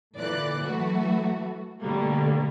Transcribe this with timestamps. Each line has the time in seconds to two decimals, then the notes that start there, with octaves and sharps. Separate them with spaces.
0.16 A#2 D3 E3 D5 F#6
0.63 E3 F#3 A3 F#4
1.80 B2 D3 G3 A3 A#3